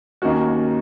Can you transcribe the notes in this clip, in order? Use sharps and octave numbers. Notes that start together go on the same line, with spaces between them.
D#2 D#3 A#3 C#4 F#4